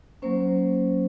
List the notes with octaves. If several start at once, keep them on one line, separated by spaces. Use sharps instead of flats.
F#3 A#3 C#4 C5